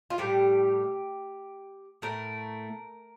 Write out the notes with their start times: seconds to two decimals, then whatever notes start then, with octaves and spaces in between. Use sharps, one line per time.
0.10 F4
0.18 A2 G3 G4
2.02 A2 A3 A#4